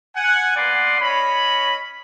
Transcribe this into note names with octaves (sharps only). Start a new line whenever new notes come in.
F#5 G#5
A#3 B3 B4 D5 F#5 C6
C#4 C#5 D#5 B5